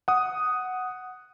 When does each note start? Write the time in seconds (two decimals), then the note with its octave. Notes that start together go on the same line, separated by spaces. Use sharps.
0.08 F#5 D#6